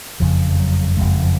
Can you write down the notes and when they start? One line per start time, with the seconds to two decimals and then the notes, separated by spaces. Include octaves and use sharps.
0.20 F#1 F2 C#3 F3
0.50 F3
0.59 F#3
0.97 F#1 F2 C#3 G#3
1.22 F3